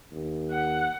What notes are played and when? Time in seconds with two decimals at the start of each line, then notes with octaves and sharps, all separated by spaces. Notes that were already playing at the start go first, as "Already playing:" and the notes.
0.12 D#2
0.51 F#5